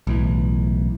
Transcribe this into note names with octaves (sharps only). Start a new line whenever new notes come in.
B1 A2 E3